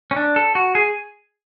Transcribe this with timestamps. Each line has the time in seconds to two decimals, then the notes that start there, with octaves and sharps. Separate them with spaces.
0.11 C#4
0.16 D4
0.36 A4
0.55 F#4
0.75 G#4